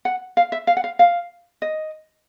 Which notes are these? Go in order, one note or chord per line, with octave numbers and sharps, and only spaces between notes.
F#5
F5
E5
F5
F#5
F5
F5
D#5